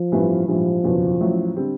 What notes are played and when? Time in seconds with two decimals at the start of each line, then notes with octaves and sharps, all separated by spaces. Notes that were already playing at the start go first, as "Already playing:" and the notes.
Already playing: F3
0.12 A1 G2 E3 G3 B3
0.48 A#1 G#2 E3 F3 G3
0.84 F#1 E2 B2 F#3
1.20 A1 A2 F#3
1.56 D3 G3 C4